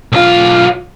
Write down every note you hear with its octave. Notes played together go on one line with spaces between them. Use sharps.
B1 F4